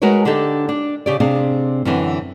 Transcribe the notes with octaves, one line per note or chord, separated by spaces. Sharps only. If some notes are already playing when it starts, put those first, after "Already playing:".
G#3 F#4 A#4 B4 C#5
D3 D4 D#4 G4 A4
D4
C#3 G4 D5
C3 C4 D4 G#4 F5
F#2 D3 E3 C4 G#5